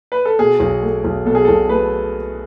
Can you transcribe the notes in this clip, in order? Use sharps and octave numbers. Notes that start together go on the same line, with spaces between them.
B4
A4
B2 G#4
B1
A3
B1
B2 A4
G#4
B1 A4
A3 B4